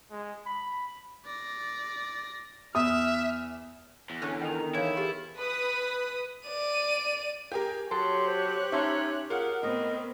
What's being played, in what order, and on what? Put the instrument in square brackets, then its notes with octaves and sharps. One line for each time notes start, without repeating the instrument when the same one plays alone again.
[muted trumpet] G#3
B5
[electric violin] D5 A#6
[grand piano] E2 [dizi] E5 [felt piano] D#6 [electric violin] F6
[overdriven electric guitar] E2
[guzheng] D3 D4 [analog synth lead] C#4
[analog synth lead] D#3 [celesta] G5 F7
[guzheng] E2 E3 [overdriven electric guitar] E4 [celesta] C#5 F5
[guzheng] F4 [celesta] G4 G#4 A#4
[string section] B4 D#6
[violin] D5 D#7
[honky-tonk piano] G4 G#4 A#4
[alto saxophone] F#3 [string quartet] G4 C#5 F#6 [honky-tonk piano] A4 [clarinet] C6
[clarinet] C5
[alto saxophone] C#4 [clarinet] D#4 [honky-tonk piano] E5 A5 C6
[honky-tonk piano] F4 F#5 [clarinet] G#4 [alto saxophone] A#4
[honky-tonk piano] A2 [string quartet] B3 C4 [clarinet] D#5